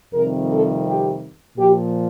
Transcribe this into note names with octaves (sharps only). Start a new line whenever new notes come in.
F2 C3 D#3 G3 A#4
A4
G4
A#2 F3 G4